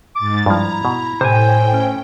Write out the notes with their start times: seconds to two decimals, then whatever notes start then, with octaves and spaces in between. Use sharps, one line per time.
0.16 G#2 D6 A6
0.46 G2 F3 E4 A#5
0.85 B2
1.21 A2 C3 C5 G5 G#5
1.73 C#4